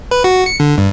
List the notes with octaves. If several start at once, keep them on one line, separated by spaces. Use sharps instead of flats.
B4
F#4
C#7
D3
G2